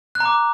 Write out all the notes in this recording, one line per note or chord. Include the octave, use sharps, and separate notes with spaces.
F#6
A#5
D6